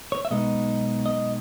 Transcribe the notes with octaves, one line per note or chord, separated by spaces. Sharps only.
C#5
E5
B1 B2 G#3 B3 D#4 D#5
D#5